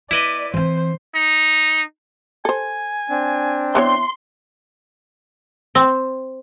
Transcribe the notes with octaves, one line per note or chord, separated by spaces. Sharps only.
B3 E4 B4 D5 D#5
E3 C4 C5
D#4
A4 C5 G#5
C4 D4
E3 B3 C#5 C6
C4